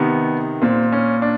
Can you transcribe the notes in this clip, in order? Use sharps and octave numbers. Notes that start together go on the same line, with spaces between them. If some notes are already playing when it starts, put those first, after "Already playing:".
Already playing: C3 D#3 B3
A#2 C4
C#4
D4